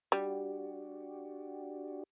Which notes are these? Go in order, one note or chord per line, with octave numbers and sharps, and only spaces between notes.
G3 D4 F#4 G4